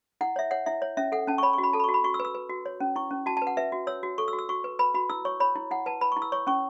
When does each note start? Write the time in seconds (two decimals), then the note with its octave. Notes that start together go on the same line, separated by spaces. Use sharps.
0.21 E4 F#5
0.36 C#5 E5
0.51 C#5 F#5
0.66 E4 E5
0.82 C#5
0.97 C#4 E5
1.12 A4 F#5
1.27 C#4 A5
1.38 C#6
1.43 C#5 B5
1.53 C#6
1.58 F#4
1.63 B5
1.73 A4 A5
1.80 B5
1.84 C#6
1.89 F#4
1.94 B5
2.04 F#4 C#6
2.14 E6
2.20 B4
2.25 E6
2.35 B4
2.50 F#4
2.66 C#5
2.80 C#4
2.96 E4 C#6
3.11 C#4
3.26 F#4 A5
3.37 A5
3.42 B4
3.47 F#5
3.57 B4 E5
3.72 F#4
3.87 C#5 E6
4.03 F#4
4.18 A4 C#6
4.28 E6
4.33 F#4
4.39 E6
4.49 F#4 C#6
4.64 B4
4.79 B4 B5
4.94 F#4 B5
5.10 E4 E6
5.25 C#5 C#6
5.40 C#5 B5
5.56 E4
5.71 E4 F#5
5.86 B4 A5
6.01 B4 B5
6.12 C#6
6.17 E4
6.22 E6
6.32 C#5 C#6
6.47 C#4 C#6